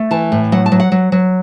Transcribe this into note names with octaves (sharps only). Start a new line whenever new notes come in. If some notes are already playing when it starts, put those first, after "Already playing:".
Already playing: A3
E3 A5
A2
F#3 F#5
A5
F#3
F#5
F#3
F#3